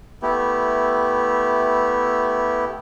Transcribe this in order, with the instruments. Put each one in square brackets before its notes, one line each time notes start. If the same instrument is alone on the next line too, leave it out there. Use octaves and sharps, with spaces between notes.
[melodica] A3 B3 E4 G4